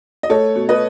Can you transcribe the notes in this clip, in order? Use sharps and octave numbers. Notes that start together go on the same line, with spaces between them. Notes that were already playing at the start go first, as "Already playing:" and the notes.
D#5
A3 A4 C#5
B2
B4 D#5